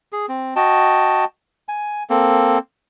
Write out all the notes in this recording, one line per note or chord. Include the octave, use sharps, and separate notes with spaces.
G#4
C4
F#4 D#5 G5 A5
G#5
A#3 C4 A4